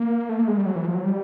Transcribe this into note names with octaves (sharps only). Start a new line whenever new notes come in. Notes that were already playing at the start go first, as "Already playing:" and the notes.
Already playing: A#3
A3
A#3
A3
G#3
G3
F#3
E3
F3
F#3
G3